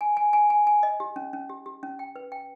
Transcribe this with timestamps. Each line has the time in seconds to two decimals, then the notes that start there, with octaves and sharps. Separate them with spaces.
0.01 G#5
0.17 G#5
0.33 G#5
0.50 G#5
0.67 G#5
0.83 D#5
1.00 G4
1.16 C#4
1.33 C#4
1.49 G4
1.66 G4
1.83 C#4
1.99 G5
2.16 B4
2.32 G5